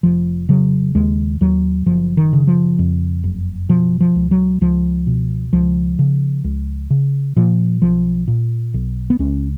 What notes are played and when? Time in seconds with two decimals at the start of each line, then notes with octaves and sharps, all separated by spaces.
0.03 F1 F3
0.49 C#3 F#3
0.95 D#2 G#3
1.41 D#2 F#3
1.86 F#1 F3
2.17 D#3
2.33 C#3
2.47 F3
2.79 F2
3.24 F#1
3.69 B2 F3
4.01 F3
4.15 C#2
4.31 F#3
4.61 C#2 F3
5.07 B2
5.53 C#2 F3
5.99 C#3
6.44 C#2
6.90 C#3
7.36 A#2 F3
7.82 B1 F3
8.28 A#2
8.74 B1
9.10 B3
9.19 C#2 C#4